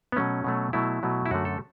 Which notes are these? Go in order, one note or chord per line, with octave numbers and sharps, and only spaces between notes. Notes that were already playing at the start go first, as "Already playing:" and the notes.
B3
B2 F#3 A3 C#4
B2 F#3 A3
B2 F#3 A3 E4
B2 F#3 A3
E4
F#2 D3 A3 F#4
A4